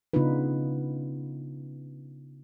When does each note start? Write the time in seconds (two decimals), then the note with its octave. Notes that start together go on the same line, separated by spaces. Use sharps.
0.14 C#3 B3 D4 D#4 F4 B4